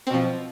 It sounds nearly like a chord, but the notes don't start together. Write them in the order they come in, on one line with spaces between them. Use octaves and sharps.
C4 B2 F3